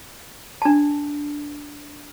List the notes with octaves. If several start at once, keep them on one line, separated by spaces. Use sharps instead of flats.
D4 A5